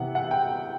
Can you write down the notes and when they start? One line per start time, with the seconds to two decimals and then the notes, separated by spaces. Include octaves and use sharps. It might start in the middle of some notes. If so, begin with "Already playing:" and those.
Already playing: C3 E3 B3 F#5
0.15 F#5
0.31 G5